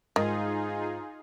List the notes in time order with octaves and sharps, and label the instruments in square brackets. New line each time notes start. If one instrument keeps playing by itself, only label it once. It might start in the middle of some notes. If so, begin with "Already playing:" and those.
[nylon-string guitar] G#2 [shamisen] D#3 [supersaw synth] D#4 F4 G#4